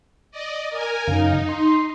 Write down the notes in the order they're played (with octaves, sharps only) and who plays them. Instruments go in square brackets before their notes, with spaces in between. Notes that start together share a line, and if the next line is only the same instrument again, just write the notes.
[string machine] D5 D#5
A#4 G#5
[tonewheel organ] F#2 C#3 F5 [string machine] D#4
[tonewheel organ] C6